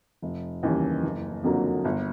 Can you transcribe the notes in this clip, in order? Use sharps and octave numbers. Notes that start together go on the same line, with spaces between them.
F1
D#2 C#3 E3 G3
F#1
F2 D3 F#3 A#3
G1